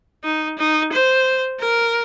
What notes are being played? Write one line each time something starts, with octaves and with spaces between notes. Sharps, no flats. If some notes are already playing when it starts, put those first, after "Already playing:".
D#4
D#4
C5
A#4